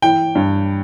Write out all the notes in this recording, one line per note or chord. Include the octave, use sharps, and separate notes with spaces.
E3 G5
G2